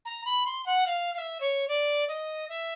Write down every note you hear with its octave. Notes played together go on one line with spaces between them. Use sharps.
A#5
B5
C6
F#5
F5
F5
E5
C#5
D5
D#5
E5